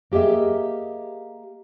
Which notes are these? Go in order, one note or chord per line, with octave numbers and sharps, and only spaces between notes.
A#3 G4 G#4 D#5 E5